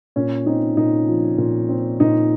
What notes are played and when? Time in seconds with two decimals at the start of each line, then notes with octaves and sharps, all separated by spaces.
0.16 A#2 C#4
0.46 C4 D#4
0.77 A#2 D#4
1.08 F3
1.38 A#2
1.69 C4
2.00 A#2 D#4